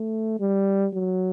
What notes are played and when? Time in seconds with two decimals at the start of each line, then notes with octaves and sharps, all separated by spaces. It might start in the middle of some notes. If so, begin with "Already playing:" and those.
Already playing: A3
0.40 G3
0.93 F#3